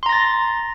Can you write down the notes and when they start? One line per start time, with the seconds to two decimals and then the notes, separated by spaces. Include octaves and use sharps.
0.03 C6
0.06 A#5
0.09 A#6
0.13 A6